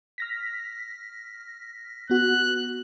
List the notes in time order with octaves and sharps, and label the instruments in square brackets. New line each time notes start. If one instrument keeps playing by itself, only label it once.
[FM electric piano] F6 A#6 B6
[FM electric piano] B3 F#4 [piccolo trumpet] F#6